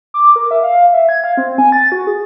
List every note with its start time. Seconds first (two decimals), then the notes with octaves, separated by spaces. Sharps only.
0.14 D6
0.36 A#4
0.51 E5
0.63 F5
0.93 E5
1.09 G#6
1.24 F5
1.37 C4
1.58 G#5
1.72 A6
1.92 F#4
2.07 G#4